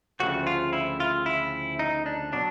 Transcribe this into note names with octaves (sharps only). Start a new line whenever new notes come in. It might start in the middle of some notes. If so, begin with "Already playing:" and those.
D2 C#3 F3 A3 C4 F#4
F4
E4
F4
E4
D#4
D4
B2 F#3 D4